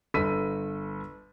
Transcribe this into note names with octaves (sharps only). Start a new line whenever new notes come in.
G1 A4 E6 B6 D#7